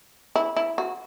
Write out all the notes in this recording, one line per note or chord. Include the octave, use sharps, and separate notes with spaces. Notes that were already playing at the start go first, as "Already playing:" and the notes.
E4
E4
F#4